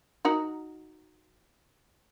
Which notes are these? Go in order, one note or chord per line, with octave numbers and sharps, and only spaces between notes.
D#4 F#4 A#4